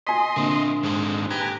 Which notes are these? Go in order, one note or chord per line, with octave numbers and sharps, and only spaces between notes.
D#5 G#5 C6 B6
A#2 D3 A3 A#3 C4
G#2 D#3 C4 A4
G4 B4 G#5 A#5